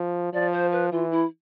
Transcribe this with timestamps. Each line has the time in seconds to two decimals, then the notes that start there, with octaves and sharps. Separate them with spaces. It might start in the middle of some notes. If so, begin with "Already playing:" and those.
Already playing: F3
0.33 F3 D5
0.52 C5
0.72 B4
0.92 E3 F4
1.12 E4